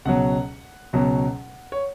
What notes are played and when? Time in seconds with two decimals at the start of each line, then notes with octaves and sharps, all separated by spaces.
0.05 C#2 B2 F#3 F#5
0.93 C#2 B2 F#3
1.72 C#5